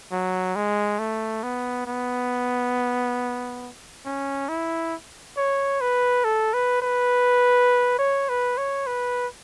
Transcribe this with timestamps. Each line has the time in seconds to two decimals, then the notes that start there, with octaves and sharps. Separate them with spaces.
0.12 F#3
0.55 G#3
0.99 A3
1.43 B3
1.86 B3
4.05 C#4
4.49 E4
5.37 C#5
5.81 B4
6.24 A4
6.53 B4
6.82 B4
7.98 C#5
8.29 B4
8.57 C#5
8.86 B4